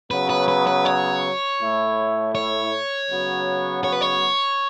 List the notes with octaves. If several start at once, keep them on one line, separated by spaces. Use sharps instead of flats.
C#3 F#3 B3 B4
B4
B4
B4
C#5
A2 A3 E4
C#5
C#3 F#3 B3 F#4
C#5
B4
C#5